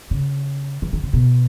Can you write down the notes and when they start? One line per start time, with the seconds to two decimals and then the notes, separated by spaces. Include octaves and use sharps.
0.11 C#3
0.82 E3
0.93 D#3
1.03 C#3
1.13 B2